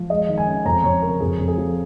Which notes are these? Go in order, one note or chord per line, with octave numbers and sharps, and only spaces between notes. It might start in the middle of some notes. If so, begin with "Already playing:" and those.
Already playing: F3
G#3 D#5
D#3
G#5
C#4
F2 A#5
F2 C#5
C#3 A#4
F2 G#4
F2
G#4
F3